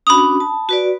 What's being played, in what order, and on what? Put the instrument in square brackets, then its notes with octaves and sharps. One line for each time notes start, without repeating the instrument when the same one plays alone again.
[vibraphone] C#4 D4 F#4 [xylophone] B5 D#6
[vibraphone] A5
F#4 B4 D5